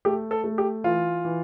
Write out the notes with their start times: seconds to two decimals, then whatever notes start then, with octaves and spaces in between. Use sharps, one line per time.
0.05 A3 G4
0.31 A4
0.44 A3
0.58 G4
0.84 E3 F4
1.25 E3